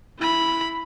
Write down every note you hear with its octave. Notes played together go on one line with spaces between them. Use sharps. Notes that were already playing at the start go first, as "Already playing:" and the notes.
E4 B5